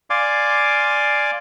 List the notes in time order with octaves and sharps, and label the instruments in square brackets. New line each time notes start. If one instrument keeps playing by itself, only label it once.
[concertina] D5 F5 G#5 C6 D6